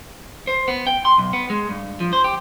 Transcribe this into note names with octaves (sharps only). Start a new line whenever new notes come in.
C5
B3
G5
C6
B1
B3
G#3
G2
F3
C5
G4